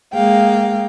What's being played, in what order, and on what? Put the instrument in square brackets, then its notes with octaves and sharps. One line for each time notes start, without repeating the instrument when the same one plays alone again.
[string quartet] G#3 A#3 G#4 F5 G5